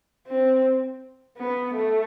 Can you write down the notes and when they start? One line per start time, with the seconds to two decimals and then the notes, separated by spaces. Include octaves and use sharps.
0.27 C4
1.38 B3
1.75 A3